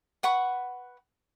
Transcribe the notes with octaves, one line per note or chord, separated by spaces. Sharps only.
B4 F#5 B5 C#6